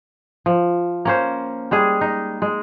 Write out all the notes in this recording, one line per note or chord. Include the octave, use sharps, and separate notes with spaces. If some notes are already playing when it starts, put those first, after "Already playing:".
F3
A#3 C#4 C5
G3 G#3 G#4
D#4
G#3